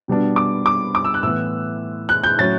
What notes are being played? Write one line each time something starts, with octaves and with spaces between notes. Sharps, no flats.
B2 G3 B3 D4
D6
D6
D6
E6
F#6
A2 E3 B3 E6
F#6
G6
A2 F#3 C#4 A6